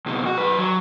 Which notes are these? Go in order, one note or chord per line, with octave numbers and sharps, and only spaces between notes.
C#2 B2
F#4
F#2 B4
F#3